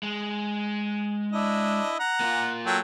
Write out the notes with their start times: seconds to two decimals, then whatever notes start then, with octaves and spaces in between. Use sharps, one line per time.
0.03 G#3
1.32 D4 E4 D#5
1.99 F#5 A#5
2.20 A#3 F4
2.66 F#3 A4 G5